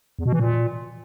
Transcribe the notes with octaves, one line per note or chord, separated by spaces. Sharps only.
E2
B2
E3
A#2